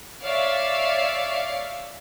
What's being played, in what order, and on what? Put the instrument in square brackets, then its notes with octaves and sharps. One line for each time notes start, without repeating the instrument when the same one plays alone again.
[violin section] C#5 D5 E5 F5